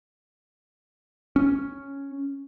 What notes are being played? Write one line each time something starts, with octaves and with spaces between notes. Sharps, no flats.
C#4